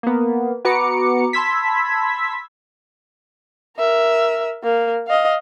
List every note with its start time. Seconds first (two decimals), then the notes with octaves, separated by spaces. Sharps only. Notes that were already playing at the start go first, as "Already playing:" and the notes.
0.03 A#3 B3
0.65 B3 F#4 B4 A#5 D6 C#7
1.33 A5 B5 C6 E6 G#6 B6
3.77 A#4 E5
4.63 A#3
5.07 D#5 F5